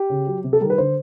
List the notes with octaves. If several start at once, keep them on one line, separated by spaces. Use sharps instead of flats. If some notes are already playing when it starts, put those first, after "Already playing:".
Already playing: G4
C#3
F#3
C3
A4
D#3 G3 A#4
B4
D3 C5